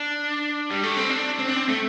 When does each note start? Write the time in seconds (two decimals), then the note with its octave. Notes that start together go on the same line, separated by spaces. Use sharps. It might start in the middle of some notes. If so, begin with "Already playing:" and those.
Already playing: D4
0.71 G3
0.83 A3
0.97 C4
1.10 D4
1.39 C4
1.48 D4
1.56 C4
1.68 A3